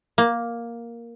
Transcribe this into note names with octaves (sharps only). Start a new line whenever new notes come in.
A#3